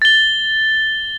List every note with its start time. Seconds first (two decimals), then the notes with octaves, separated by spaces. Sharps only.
0.02 A6 G7